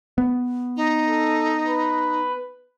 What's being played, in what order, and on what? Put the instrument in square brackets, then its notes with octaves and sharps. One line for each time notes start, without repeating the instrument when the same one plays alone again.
[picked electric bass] B3
[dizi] D#4
[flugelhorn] A4
B4